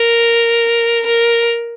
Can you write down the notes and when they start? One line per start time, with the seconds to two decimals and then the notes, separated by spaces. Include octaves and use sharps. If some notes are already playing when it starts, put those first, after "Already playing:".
Already playing: A#4
1.06 A#4